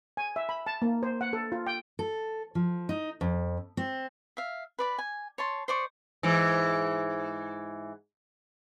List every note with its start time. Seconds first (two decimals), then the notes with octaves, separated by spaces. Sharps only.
0.17 G#5
0.36 E5
0.49 B5
0.67 A5
0.82 A#3
1.03 C5
1.21 F#5
1.33 A4
1.52 F4
1.67 G5
1.99 A4
2.55 F3
2.89 D#4
3.21 F2
3.77 C4
4.37 E5 F5
4.79 B4 D5 B5
4.99 G#5
5.38 C#5 A5 C6
5.68 C5 D5 C#6
6.23 G#2 E3